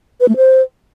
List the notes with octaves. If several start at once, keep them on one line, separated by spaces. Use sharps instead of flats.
B4
A3
C5